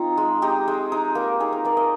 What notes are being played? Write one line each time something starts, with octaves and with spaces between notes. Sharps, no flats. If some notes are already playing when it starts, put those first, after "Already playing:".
Already playing: C4 D#4 F4
G#3
D#4 G4
G#3
D#4
A#3
D#4 G#4
A#4
A#3 D5
D#5